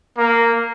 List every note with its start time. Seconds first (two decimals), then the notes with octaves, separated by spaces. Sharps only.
0.18 A#3